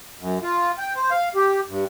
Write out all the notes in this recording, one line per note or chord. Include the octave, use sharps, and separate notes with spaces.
F#2
F4
G5
C5
F5
G4
G2